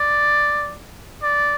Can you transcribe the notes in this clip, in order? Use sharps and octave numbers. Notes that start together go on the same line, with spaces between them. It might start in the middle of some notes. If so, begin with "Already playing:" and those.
Already playing: D5
D5